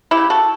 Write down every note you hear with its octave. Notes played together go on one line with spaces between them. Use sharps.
E4 G4
C#3
F#4 A4